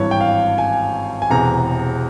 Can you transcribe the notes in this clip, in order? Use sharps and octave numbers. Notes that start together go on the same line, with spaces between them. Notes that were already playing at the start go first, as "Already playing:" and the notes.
Already playing: G#1 G2 E3 C#5
G5
F5
G#5
G#5
E1 E2 C3 E3 A#5